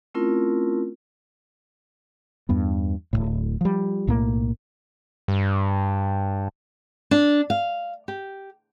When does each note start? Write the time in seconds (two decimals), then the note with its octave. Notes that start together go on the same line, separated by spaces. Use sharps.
0.14 A3 C4 C#4 E4 F4 A#4
2.49 E2 G2 B3
3.13 D1 C2 A2
3.61 F3 G3
4.07 B1 A2 A3 A#3
5.28 G2
7.11 D4
7.50 F5
8.08 G4